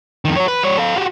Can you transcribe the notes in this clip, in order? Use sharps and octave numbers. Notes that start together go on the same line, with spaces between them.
F2 D#3
F#4 C#5
B4
G3 C#5
A4 F5
F#4 G4